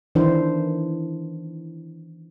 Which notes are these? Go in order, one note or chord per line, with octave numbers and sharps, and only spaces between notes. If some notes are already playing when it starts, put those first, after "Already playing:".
D#3 E3 D4 E4 C5